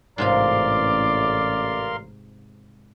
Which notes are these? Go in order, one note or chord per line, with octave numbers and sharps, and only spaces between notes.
A1 G#2 C3 F4 A#4 D5 F5 C6